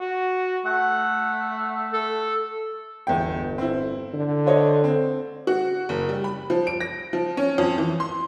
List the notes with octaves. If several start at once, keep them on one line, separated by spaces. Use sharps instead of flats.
F#4
A3 F#5
A4
G1 E2 G5
C4 E4
D3
C5 C#5 D#5
C4
F#4
F#1
G3
B5
F3
D7
A#6
F3
C#4
F2
E3
C6